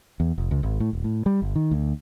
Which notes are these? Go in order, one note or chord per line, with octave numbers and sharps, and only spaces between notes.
E2
F1
C#2
G#1
A2
D#1
A2
G3
G1
D#3
D2